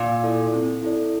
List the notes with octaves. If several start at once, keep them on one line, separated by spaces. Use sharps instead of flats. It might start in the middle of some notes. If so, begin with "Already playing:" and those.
Already playing: A#2
E4 A4 D5
C4
E4 A4 D5